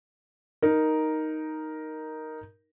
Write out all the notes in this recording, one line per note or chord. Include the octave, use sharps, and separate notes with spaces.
D#4 A#4